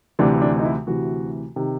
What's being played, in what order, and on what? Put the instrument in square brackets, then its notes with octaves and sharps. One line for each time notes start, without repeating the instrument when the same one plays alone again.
[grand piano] D2 C3 E3 D4
D4
D#4
E4
D2 C3 E3 F#4
C3 D#3